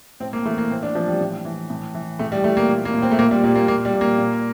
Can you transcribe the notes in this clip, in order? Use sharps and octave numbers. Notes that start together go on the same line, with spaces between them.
A2 C4
A#3
E3 A3
A#3
A2 C4
D4
E3 F3
G3
A2
E3
A2
E3
A2 A3
G3
E3 A3
A#3
A#2
A#3
A#2
C4
A3
A#2 A#3
G3
A#2 G3
A#3
A#2 A#3
G3
A#2
A#3
A#2